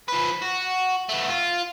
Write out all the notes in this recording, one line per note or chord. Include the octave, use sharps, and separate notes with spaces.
F3 B4
F#4
A3 B3
F4